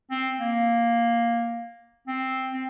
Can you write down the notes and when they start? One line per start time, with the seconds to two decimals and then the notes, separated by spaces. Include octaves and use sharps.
0.11 C4
0.39 A#3
2.07 C4
2.53 C4